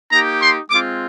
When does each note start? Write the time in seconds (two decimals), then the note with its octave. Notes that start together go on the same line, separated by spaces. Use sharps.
0.12 A#3 D#4 G4 A#5
0.41 C6
0.71 G#3 C4 F4 D6